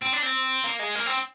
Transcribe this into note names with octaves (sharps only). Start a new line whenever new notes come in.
C4
D4
C4
A#3
G#3
A#3
C4